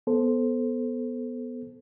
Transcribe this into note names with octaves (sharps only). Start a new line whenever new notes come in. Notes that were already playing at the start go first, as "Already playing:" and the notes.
B3 A4 C5